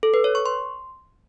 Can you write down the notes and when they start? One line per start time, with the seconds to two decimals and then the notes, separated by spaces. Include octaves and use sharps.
0.03 A4
0.14 B4
0.24 C#5
0.35 C#6
0.46 C6